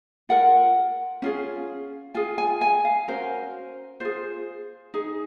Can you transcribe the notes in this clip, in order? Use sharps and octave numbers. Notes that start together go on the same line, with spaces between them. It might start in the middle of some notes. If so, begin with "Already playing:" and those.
F4 A#4 F#5
C#4 F4 G#4
F4 G#4 G#5
G#5
G#5
F5
C#4 F#4 A#4 C5
F4 G#4 C5
D#4 G#4